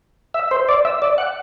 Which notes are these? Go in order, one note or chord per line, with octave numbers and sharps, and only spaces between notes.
E5
C5
D5
E5
D5
F#5